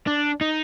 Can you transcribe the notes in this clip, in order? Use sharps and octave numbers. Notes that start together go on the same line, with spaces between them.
D4
D#4